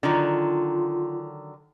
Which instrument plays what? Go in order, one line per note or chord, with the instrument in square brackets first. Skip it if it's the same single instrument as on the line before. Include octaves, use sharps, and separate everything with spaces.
[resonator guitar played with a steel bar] D3 D#3 F#3 [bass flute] F4